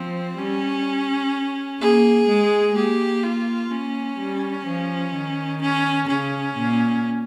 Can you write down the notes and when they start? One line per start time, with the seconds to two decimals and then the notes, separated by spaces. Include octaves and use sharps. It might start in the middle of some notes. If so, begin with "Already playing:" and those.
Already playing: F3 C4
0.38 G3 C#4
1.80 A#3 G#4
2.29 G#3
2.75 A#3 G4
3.23 F4
3.71 A#3 C#4
4.19 G3
4.66 F3
5.14 D#3
5.61 C#4
6.08 C#3 C#4
6.57 A#2